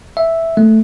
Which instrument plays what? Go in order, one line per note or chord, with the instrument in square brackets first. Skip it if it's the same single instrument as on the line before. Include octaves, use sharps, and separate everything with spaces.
[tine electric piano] E5
A3